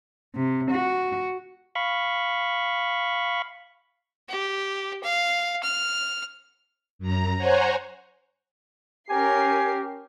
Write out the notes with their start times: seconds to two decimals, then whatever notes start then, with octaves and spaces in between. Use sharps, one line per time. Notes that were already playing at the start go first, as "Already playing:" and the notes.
0.35 C3
0.71 F#4
1.75 F5 B5 C#6
4.29 G4
5.03 F5
5.63 F6
6.99 F#2 A#5
7.38 C5 C#5 F#5 G#5 A#5
9.10 C#4 G4 A#4 G#5 C7